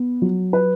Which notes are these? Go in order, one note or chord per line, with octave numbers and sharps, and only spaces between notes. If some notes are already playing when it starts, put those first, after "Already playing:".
Already playing: B3
F#3
B4